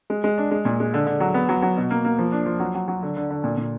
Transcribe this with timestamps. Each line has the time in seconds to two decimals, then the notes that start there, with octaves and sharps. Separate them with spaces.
0.10 G#3
0.24 G#3
0.38 D4
0.51 G#3
0.65 A#2
0.80 G#3
0.94 D3
1.06 D3
1.20 F#3
1.34 B3
1.49 F#3
1.62 F#3
1.77 B2
1.91 A#3
2.05 A#3
2.19 F3
2.32 D4
2.46 F3
2.60 F#3
2.75 F#3
2.88 F#3
3.03 D3
3.17 D3
3.30 D3
3.44 A#2
3.57 A#2